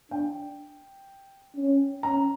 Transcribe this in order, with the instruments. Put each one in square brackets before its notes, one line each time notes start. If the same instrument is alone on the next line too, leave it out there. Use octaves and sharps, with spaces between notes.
[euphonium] D4 [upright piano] G5
[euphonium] C#4
[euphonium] C#4 [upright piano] A#5